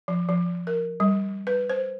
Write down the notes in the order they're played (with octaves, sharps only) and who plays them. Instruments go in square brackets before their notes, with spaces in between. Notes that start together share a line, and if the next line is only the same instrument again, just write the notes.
[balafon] F3
F3
A#4
G3
B4
C5